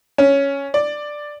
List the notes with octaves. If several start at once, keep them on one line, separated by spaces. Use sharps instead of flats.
C#4
D5